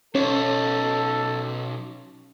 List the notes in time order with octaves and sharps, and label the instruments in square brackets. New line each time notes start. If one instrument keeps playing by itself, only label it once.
[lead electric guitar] B1 [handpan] C#4 C#5 [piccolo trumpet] A4